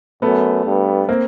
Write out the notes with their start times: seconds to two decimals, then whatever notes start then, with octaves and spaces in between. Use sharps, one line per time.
0.22 F#2 A3 B3
0.66 G2
1.09 A#3 C4